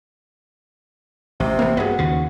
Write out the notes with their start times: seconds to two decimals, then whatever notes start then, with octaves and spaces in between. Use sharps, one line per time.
1.40 A1 C3
1.59 A#3 B3
1.77 G2 F#4 G#4 B4
1.98 D#2 C#3